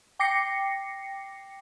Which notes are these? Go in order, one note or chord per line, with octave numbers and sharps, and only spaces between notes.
G5 D6 A#6 C7 C#7